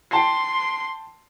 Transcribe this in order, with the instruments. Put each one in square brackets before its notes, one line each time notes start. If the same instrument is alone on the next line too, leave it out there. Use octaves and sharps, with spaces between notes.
[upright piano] G5 A5 C7 [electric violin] C6